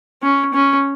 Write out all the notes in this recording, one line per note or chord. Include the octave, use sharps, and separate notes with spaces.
C#4
C#4